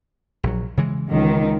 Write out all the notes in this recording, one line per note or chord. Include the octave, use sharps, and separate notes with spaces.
A#1 F#3
C#3 E3 G#3
C#2 D#3